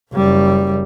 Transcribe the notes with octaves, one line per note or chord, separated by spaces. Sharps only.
F#1 G3